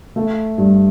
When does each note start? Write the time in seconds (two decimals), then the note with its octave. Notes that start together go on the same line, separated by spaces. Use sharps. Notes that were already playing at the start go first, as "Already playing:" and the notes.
0.16 A3
0.58 G2